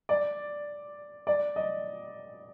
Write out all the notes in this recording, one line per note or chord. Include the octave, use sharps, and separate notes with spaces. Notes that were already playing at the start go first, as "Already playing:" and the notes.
D5
D5
D#5